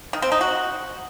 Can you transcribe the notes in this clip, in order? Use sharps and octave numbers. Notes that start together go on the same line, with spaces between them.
D#3
C4
D#4
F#4